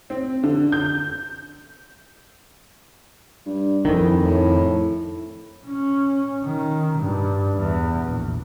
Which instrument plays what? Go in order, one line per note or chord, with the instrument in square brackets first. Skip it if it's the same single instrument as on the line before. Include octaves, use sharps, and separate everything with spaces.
[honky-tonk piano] C4
D3
G6
[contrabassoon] G2
[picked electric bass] F2 D#3 [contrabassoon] E3
[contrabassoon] A2
[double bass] C#4
D#3
G2
E2
A#1